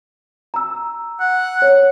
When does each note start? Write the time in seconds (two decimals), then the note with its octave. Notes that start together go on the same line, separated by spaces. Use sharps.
0.54 A#5 E6
1.20 F#5
1.62 C#5